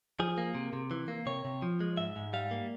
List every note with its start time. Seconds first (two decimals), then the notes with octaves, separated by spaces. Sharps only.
0.20 F3 G#4
0.38 A#3
0.55 C3
0.73 C3
0.91 E3
1.08 A#3
1.26 C3 C#5
1.45 C3
1.62 F3
1.80 G#3
1.97 G#2 E5
2.16 G#2
2.33 G3 F5
2.51 A#3